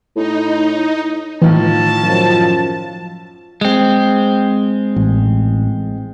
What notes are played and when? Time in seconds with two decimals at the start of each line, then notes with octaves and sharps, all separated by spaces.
0.16 A2 D#4
1.42 A2 D#3 E3 F4 A5
2.03 F#2 F3
3.61 G#3 C4
4.96 A1